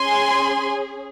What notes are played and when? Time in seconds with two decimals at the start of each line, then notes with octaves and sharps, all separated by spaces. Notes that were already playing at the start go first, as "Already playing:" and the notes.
Already playing: C#4 G#4 G#5 C6